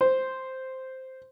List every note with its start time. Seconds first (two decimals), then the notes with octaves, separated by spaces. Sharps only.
0.01 C5